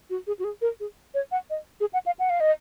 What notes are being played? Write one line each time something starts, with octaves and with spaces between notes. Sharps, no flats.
F#4
G#4
F#4
G#4
A#4
G#4
C#5
F#5
D#5
G#4
F#5
F5
F#5
F5
D#5